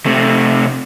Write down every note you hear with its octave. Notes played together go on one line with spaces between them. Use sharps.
C3 A3